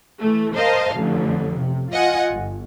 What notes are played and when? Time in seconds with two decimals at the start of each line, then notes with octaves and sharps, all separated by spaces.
0.20 E3 A3
0.56 A#4 C5 D#5 F5 A5
0.95 A1 F2 D3
1.59 C3
1.92 F4 D#5 F#5 G#5
2.32 G1